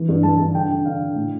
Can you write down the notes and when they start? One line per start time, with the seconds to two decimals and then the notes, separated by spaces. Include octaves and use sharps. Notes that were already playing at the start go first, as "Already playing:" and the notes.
Already playing: E3
0.09 G2
0.23 G2 A5
0.39 G2
0.54 D3 G5
0.70 D3
0.85 D3 F5
1.01 D3
1.16 A2